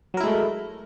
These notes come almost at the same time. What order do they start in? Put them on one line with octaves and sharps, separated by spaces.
F#3 A#4 E4 G#3 A3